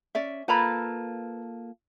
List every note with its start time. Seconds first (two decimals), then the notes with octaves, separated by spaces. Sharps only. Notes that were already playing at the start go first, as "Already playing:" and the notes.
0.15 C#4 D5 E5
0.48 A#3 F4 A4 B4 A#5 B5